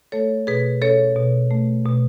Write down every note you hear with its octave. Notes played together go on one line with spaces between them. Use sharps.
A3 A4 C#5
B2 G#4 B4
C#4 A4 C#5
B2
A3
B2